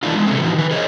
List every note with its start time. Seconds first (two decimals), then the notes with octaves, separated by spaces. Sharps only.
0.03 E3 A3 D4 D#4 F4
0.15 G#3 B3
0.26 C3 G#3 A3 C4
0.39 A2 E3 F3 D#4 F#4
0.54 D#3 B4
0.71 G#4 A#4 C5 C#5 D#5